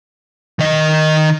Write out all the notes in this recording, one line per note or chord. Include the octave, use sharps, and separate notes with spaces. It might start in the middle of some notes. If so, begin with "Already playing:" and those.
D#3 D#5